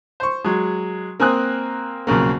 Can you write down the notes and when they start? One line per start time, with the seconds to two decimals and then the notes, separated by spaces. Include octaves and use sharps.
0.20 C5 C#6
0.44 F#3 G#3
1.19 A#3 C4 G#5 D#6 F#6
2.07 B1 F2 C#3 A#3